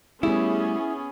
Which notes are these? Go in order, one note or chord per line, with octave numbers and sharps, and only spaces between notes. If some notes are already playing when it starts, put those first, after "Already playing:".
G3 A3 B3 C#4 E4 G#4